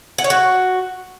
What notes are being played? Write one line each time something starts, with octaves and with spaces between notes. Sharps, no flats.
F#5
C#5
F#4